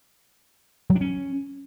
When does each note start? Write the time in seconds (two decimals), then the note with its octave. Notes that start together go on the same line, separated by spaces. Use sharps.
0.90 F#3
0.95 D4
1.01 C#4